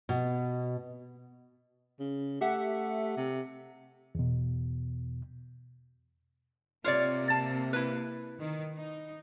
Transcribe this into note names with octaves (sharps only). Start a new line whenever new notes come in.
B2
C#3
A3 G4 E5 F#5
C3
E2 B2
C3 A#3 F4 C#5 D5
A5
E4 B4
D#3
D#4